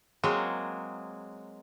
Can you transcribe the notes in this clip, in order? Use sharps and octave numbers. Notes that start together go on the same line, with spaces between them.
F#3 G#3 A#3 C4 G#4